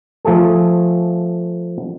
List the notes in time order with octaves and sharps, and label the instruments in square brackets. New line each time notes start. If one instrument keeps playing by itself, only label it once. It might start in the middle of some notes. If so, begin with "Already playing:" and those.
[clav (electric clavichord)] F3 A3 G#4 A4